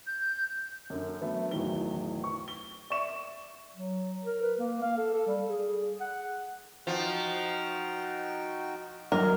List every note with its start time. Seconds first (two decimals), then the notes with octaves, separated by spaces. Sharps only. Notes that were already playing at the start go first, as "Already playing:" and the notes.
0.07 G6
0.90 F#2 D3
1.21 F#3 A3 B3
1.51 D1 E2 D#3 F#3 B3 G7
2.24 C#6
2.48 G7
2.90 D5 E5 C#6 E7
3.75 F#3
4.24 A#4
4.42 B4
4.59 A#3
4.82 F5
4.97 A4
5.13 A4
5.27 G3
5.50 G#4
6.01 F#5
6.87 F3 D#4 F#4 G5
9.12 G2 F#3 A#4 D#5